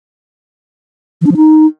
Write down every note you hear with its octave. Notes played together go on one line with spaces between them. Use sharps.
E3
D4
F3
D#4